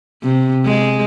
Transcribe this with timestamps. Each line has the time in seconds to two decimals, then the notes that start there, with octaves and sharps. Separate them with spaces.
0.23 C3
0.65 G#3